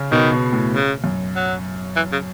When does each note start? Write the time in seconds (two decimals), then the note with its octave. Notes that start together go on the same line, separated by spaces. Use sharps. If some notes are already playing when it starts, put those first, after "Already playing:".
Already playing: C#3
0.11 B2 D#3
0.32 B2
0.52 A2
0.73 C#3
1.04 F#2
1.35 F#3
1.96 E3
2.12 C#3